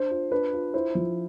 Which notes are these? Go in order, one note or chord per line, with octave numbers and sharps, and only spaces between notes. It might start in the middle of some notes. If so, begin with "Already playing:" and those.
Already playing: D4 C5
F4
D4 B4
F4
E4 C5
F3